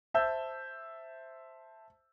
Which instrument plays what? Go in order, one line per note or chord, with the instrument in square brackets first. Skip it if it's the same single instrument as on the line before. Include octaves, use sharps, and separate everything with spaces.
[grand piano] C5 E5 A5 E6 G6